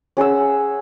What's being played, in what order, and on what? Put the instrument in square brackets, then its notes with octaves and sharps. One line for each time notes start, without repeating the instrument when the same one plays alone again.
[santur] C#4 G#4 F#5 E6